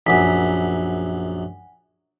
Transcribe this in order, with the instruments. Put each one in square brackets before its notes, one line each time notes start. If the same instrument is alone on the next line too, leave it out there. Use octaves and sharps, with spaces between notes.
[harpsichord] A#1 F#2 [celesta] F#5 G#5 B6